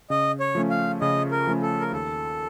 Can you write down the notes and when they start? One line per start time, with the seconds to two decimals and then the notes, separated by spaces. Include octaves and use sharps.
0.10 C#3 D#5
0.40 C#5
0.55 F3 A3 C#4
0.70 F5
1.01 C#3 D#5
1.31 A#4
1.47 F3 A3 C#4
1.62 A4
1.80 A#4
1.92 D#2 A4